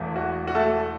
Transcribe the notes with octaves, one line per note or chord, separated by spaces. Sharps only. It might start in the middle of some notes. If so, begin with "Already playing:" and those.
Already playing: E1 E2 E3 A3
F#4
F#4
A3 A4